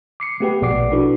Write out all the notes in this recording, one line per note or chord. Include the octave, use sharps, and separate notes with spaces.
D6 C7 C#7
A3 B3 G4 G#4 B4 G5
A#1 B2 D5 F#5 D6 C7
D4 E4 F#4 A4 B4